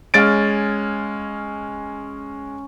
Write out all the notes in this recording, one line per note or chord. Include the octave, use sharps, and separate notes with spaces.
G#3 C#4 F5 G#5 A6 D7